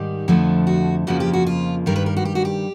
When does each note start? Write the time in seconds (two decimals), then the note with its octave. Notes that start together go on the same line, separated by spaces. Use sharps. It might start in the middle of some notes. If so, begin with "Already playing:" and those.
Already playing: G#2 D#3 G3 G4
0.28 F2 D3 F3 A3 D4
0.67 F#4
1.07 F2 C#3 F3 A#3 F#4
1.20 G4
1.33 F#4
1.47 F4
1.86 G2 D#3 G3 A#4
1.96 B4
2.06 A#4
2.17 F#4
2.25 G4
2.35 F#4
2.45 G4